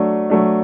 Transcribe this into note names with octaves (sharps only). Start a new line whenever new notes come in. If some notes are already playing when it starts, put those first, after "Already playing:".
Already playing: F#3 A3 D4
F#3 A3 D4